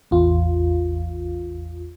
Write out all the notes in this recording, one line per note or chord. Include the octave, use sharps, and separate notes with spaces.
A1 E2 F4